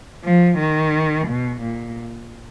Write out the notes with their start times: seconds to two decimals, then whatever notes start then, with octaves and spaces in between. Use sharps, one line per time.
0.24 F3
0.58 D#3
1.28 B2
1.62 A#2